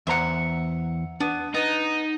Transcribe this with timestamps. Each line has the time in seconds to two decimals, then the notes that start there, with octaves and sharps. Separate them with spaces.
0.07 E2 C5 E5 F#5 A#5
1.20 B3 D4
1.54 B3 D#4